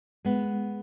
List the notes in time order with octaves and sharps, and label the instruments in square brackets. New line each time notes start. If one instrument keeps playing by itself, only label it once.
[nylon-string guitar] G#3 B3